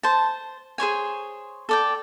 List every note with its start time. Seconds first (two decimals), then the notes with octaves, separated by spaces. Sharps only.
0.03 C5 A5
0.78 G#4 C5 C#5 G#5
1.69 A4 D5 G5